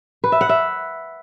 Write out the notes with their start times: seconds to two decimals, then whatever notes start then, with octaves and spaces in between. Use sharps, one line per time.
0.24 B4
0.32 E5
0.41 F#5
0.49 E5